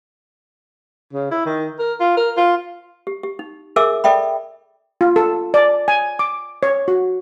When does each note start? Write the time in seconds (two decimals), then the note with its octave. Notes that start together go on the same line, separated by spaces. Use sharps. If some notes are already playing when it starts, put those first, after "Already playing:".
1.13 C#3
1.31 E4
1.46 D#3
1.79 A#4
2.00 F4
2.17 A#4
2.37 F4
3.07 G4
3.23 G4
3.39 D#4
3.76 G#4 A#4 E5 G#5 D6 E6
4.04 A4 D5 E5 G5 B5
5.01 F4
5.16 A4
5.54 D5
5.88 G#5
6.19 D6
6.63 C#5
6.88 F#4